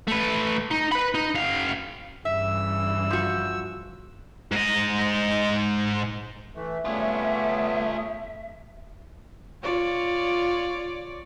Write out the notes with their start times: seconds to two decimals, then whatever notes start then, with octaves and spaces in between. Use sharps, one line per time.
0.07 A3 B4
0.71 D#4
0.92 B4 B5
1.15 D#4
1.35 F#2 F5
2.25 G2 C#3 E3 E5 E6
3.10 F3 F#4
4.51 G#2 D#5
6.55 E3 A3 E5
6.85 G3 A3 B3 F4 G#4 C#5
9.63 F4 C#5 D5